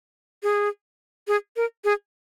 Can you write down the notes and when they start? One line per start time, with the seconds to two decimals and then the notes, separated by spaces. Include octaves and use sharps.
0.43 G#4
1.28 G#4
1.56 A#4
1.84 G#4